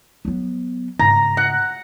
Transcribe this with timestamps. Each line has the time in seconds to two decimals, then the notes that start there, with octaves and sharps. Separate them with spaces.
0.25 F#3 B3
0.99 G#2 C#3 A#5
1.37 F#5